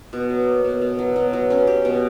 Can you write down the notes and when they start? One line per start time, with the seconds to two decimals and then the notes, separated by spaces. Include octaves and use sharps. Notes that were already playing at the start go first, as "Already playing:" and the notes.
0.13 B2
0.30 F#3
0.47 A#3
0.64 B2
0.81 B2
0.99 F#3
1.16 B2
1.33 F#3
1.50 C#4
1.67 G4
1.85 B2